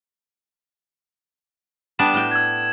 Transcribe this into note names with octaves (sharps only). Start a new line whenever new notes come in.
G3 B3 D4 E7
A2 G5
E6 G#6